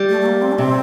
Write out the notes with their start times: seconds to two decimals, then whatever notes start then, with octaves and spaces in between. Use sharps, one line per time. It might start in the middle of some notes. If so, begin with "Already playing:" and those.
Already playing: G3
0.09 A3
0.21 A3
0.26 A#3
0.42 C4
0.52 D4
0.58 C3 C4